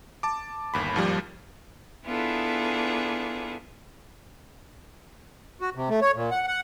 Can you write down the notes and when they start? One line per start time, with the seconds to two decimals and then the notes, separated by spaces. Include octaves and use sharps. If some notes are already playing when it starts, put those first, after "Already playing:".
0.23 A5 D6
0.74 G1 D#2 B5
0.94 G#1 D#2 F3 G3
2.05 B3 D4 E4 F4 G#4 A4
5.61 F#4
5.75 C3
5.89 A3
6.01 C#5
6.15 A#2
6.31 F#5
6.47 F#5